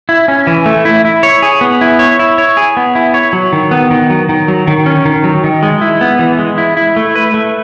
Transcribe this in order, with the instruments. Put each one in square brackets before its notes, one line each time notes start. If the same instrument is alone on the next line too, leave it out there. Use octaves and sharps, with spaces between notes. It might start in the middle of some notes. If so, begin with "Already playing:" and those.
[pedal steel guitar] E4
C#4
E3
A3
E4
E4
C#5
G#4
B3
E4
C#5
E4
C#5
G#4
B3
E4
C#5
F#3
D#3
B3
D#3
F#3
D#3
F#3
D#3
C#4
D#3
F#3
D#3
G#3
E4
B3
E3
G#3
E4
E4
A3
B4
A3